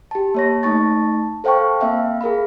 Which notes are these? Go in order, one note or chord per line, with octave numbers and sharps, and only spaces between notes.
G4 A5
A#3 C#5 A#6
A3 D#4 A5 C#6 A6
A4 C5 F5 G5 A5 C#6
A#3 C4 E5 F5 G5
G#4 A#4 F5 B5